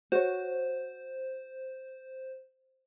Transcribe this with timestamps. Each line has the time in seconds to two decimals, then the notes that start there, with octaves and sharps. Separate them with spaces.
0.12 F#4 C5 C#5